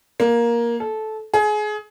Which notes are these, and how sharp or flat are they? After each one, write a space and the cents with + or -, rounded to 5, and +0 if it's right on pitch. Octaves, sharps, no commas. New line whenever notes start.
A#3 +10
A4 -15
G#4 +25